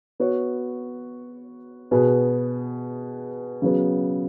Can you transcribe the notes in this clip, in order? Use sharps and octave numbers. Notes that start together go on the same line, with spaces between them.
B3 F#4 C#5
B2 B3 G#4 B4
C#3 F#3 B3